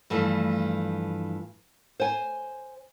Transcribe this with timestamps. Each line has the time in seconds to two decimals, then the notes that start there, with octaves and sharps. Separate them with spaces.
0.10 G2 E3 F3 A3
2.00 C5 G#5